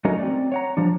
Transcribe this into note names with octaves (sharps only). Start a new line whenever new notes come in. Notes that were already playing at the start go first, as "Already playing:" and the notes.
F#3 A3 C#4 D#4 F#4 A#4
C4 D5
C#5 F#5 A#5
F3 G3 D4